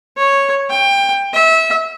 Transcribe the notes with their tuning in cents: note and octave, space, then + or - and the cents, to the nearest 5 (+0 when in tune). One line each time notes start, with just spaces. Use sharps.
C#5 -5
G5 +20
E5 -25